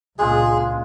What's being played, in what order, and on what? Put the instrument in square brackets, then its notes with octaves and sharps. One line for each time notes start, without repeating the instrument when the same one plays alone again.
[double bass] C#2 A#2 [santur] G#3 D4 F4 [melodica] G#4